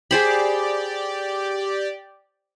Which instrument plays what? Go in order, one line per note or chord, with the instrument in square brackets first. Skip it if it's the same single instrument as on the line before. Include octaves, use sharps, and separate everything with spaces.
[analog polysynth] G4 D5 [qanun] G#4 C5 B5